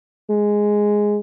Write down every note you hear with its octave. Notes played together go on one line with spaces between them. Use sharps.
G#3